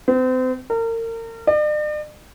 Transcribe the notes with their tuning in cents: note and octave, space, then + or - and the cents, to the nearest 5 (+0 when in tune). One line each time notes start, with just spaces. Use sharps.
C4 -35
A#4 -35
D5 +45